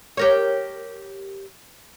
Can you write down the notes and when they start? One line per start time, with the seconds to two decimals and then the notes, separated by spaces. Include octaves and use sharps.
0.17 G4 A#4 C#5